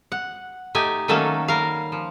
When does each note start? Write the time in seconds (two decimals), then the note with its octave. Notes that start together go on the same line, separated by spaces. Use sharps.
0.12 F#5
0.75 A3 D#4 G4 G#5
1.08 D#3 F#3 A3 A#3 C#4 A4
1.48 G3 A#4 F5
1.92 F3